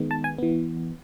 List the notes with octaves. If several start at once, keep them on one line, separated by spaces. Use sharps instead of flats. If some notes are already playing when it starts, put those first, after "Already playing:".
Already playing: D#3 G#3 B3
A5
G#5
E3 B3